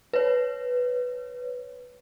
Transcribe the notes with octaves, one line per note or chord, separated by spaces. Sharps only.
B4 C#5